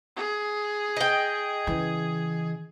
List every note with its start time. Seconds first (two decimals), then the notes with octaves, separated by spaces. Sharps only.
0.17 G#4
0.97 D#5 G5
1.67 C#3 E3